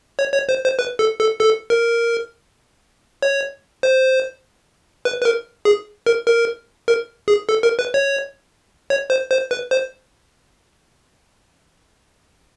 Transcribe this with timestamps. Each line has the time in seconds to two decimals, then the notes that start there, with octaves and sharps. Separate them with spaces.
0.19 C#5
0.34 C#5
0.49 C5
0.64 C5
0.79 B4
0.99 A4
1.20 A4
1.40 A4
1.70 A#4
3.22 C#5
3.83 C5
5.05 B4
5.21 B4
5.25 A#4
5.65 G#4
6.06 A#4
6.26 A#4
6.88 A#4
7.28 G#4
7.49 A4
7.63 A#4
7.79 B4
7.94 C#5
8.90 C#5
9.10 C5
9.31 C5
9.51 B4
9.71 C5